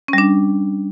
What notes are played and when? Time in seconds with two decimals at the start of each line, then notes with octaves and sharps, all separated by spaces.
0.08 C#4
0.13 G3
0.18 D4